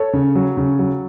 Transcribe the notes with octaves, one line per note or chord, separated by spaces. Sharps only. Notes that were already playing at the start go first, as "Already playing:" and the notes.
Already playing: A4 C#5
C#3
F#3
C#3
F#3